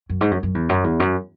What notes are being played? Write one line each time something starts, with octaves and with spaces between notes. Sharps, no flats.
F#2
G#2
F#2
F#2
E2
F#2
E2
F#2